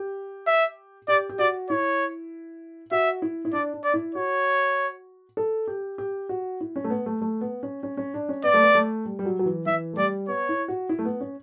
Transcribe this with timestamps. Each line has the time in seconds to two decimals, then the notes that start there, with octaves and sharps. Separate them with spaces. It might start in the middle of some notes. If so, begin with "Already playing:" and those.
Already playing: G4
0.47 E5
1.08 G4 D5
1.30 G4
1.39 F#4 D5
1.69 E4 C#5
2.91 F#4 E5
3.22 E4
3.45 E4
3.53 D4 D5
3.74 D4
3.84 D5
3.94 E4
4.14 F#4 C#5
5.37 A4
5.68 G4
5.98 G4
6.29 F#4
6.61 E4
6.76 C#4
6.84 A3
6.90 B3
7.06 A3
7.22 A3
7.41 B3
7.63 C#4
7.83 C#4
7.97 C#4
8.14 D4
8.29 C#4
8.44 B3 D5
8.54 A3
8.62 B3
8.75 A3
9.06 G3
9.19 G3
9.25 F#3
9.39 F#3
9.46 E3
9.66 E3 E5
9.93 A3
9.97 G3 D5
10.28 B3 C#5
10.49 E4
10.68 F#4
10.89 E4
10.99 A3
11.05 B3
11.20 C#4